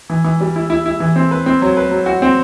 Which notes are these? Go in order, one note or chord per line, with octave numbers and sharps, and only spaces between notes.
E3
E3
G3
E4
E4
E4
E3
C4
B4
C4
F#3
B4
F#3
F#4
C4